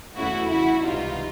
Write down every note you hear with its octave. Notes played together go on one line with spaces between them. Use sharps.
E2 C#3 E3 A3 E4 F#4
E4 F#4
C#2 C3 E3 G3 D#4 F4